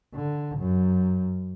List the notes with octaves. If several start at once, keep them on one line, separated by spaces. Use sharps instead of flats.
D3
F#2